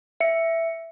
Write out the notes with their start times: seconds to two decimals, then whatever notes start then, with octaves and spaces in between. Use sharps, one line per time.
0.20 E5 C#7